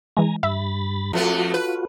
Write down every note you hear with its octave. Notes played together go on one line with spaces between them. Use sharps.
E3 G#3 G#5 A#5
G2 E5 B5 A6
F2 A3 B3 F4 F#4
B4